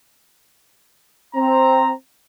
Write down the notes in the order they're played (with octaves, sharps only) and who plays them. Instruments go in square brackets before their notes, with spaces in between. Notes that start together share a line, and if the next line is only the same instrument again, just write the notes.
[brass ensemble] C4 A#5